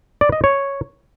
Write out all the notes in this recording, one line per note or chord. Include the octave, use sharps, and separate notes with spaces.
D5
D#5
C#5